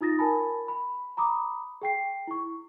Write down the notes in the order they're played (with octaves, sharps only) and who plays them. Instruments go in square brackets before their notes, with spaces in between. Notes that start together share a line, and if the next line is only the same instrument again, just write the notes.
[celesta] D#4 F4 D#6 A6 A#6
A#4 G#5 A5 B5
B5
A#5 B5 D6 D#6
G#4 G5 C7
E4 C#6